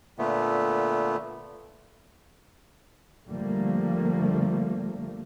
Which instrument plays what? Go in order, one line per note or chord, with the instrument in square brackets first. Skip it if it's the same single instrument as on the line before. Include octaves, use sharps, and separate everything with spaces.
[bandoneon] A#2 D3 A3 B3
[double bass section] D3 F3 G3 A3 A#3